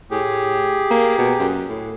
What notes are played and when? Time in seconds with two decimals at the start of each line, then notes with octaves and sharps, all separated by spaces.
0.11 A2 G4 G#4
0.91 A#3
1.18 B2
1.39 F#2
1.69 A2